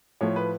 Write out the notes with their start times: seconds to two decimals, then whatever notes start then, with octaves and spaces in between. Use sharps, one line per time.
0.21 A2 F3 C#5
0.36 B4